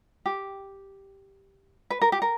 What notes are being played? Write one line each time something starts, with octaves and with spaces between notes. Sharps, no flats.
G4
B4
A#4
G4
A#4